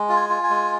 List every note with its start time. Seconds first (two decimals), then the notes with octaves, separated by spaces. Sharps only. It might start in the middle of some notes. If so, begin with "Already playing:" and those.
Already playing: G#3
0.09 F4
0.16 G#5
0.29 F4
0.44 G#5
0.50 G#3